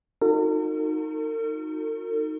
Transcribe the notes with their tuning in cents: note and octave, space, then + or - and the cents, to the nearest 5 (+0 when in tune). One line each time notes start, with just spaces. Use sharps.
D#4 +0 F#4 -35 A#4 -45